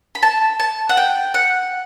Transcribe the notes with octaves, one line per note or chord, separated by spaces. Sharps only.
B5
A5
A5
F#5
G5
F#5